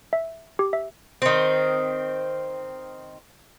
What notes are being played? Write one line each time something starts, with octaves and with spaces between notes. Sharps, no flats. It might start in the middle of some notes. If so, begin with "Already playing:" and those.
E5
G4
E5
D#3 C4